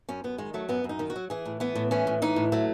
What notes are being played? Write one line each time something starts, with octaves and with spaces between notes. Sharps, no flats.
F#2 C#4
F#2 B3
D#3 G#3
F#3 A3
F#2 B3
F#2
D#4
D#3
F#4
F#3
E3 G#4
A2
E3 B3
A2
E3 C#4
A2
E3 D#4
A2
F#3 A3